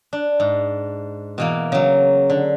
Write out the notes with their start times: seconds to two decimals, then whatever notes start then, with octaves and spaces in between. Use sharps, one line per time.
0.13 D4
0.40 G#2
1.38 B2 E3 A#3
1.72 C#3 F#3
2.30 D3